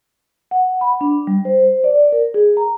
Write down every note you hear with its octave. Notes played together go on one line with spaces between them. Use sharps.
F#5
B5
D4
G3
C5
D5
A#4
G#4
A#5